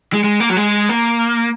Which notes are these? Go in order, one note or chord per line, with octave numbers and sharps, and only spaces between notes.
G#3
G#3
A#3
F#3
G#3
A#3